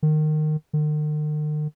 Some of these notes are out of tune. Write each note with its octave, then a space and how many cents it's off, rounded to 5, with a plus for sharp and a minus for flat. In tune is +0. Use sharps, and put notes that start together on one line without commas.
D#3 -20
D#3 -45